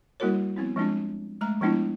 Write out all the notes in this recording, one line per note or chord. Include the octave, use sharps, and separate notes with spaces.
G3 A#3 E4 F#4 A#4 C#5
F3 B3 C4 E4
F3 G#3 C4 D4 F4
G#3 A3 A#5
F3 G#3 B3 D4 E4 F4